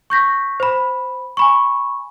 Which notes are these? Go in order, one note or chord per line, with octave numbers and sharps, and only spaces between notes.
C#6 G6 A#6 B6
C5 B5
G#5 B5 C#6